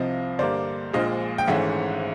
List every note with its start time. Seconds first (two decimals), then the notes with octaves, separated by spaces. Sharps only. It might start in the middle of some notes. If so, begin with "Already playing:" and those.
Already playing: C2 C3 F3 D#5 F5
0.39 G2 D3 G3 A#3 C5 D5
0.93 A#1 A#2 F3 G#3 D#5 F5
1.38 G5
1.47 G#1 G#2 E3 A3 C#4 E5 F#5